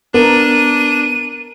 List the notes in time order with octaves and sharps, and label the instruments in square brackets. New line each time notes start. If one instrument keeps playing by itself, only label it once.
[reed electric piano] B3 [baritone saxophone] D4 [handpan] A#4 [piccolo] D#7